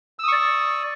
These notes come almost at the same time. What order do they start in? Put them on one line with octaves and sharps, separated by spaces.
E6 D#6 C#6 D5